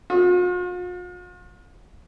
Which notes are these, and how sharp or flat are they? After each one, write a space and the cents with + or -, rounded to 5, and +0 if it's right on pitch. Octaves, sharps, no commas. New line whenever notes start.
F4 +45